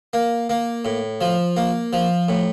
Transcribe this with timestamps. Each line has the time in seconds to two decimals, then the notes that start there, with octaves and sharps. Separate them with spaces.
0.13 A#3
0.50 A#3
0.85 A2
1.21 F3
1.57 A#3
1.93 F3
2.28 A2